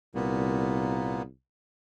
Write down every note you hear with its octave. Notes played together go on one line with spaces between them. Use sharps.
C2 A#2 A#3 B3